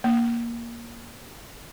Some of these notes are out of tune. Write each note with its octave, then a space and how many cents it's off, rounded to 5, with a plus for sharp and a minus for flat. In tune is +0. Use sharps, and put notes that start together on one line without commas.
A#3 +10